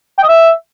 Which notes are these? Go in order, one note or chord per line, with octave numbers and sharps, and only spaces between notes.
G5
D#5
E5